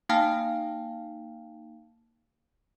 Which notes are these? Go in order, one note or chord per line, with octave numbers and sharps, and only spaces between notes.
A#3 D#4 F5 G5 A5 F6